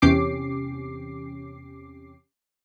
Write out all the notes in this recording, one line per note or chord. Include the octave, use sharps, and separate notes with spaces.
E2 C3 C#4 G4 D6 C7